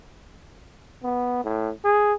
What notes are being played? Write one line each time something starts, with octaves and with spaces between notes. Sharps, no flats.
B3
A2
G#4